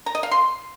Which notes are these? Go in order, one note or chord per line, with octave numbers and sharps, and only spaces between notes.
A#5
D#5
F5
C6